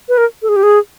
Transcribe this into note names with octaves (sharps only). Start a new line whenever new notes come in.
B4
A#4
A4
G#4
G4
G#4